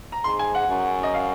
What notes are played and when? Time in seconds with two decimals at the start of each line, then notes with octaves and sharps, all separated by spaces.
0.12 A#5
0.24 G#2 C6
0.39 G#5
0.55 F#5
0.68 F#2
1.03 D#5
1.14 F5